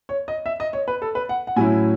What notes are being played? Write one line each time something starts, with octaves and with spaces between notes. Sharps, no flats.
C#5
D#5
E5
D#5
C#5
B4
A4
B4
F#5
F#5
A2 F#3 C#4 E4 G#5